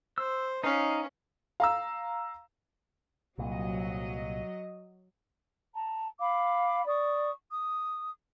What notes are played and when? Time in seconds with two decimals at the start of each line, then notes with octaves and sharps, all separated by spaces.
0.18 C5 E6
0.64 C#4 D#4 F5
1.60 F5 A#5 E6
3.38 C2 A#2 F#3 D#5
5.75 A5 A#5
6.20 F5 B5 D6
6.86 D5 C#6 D#6
7.52 D#6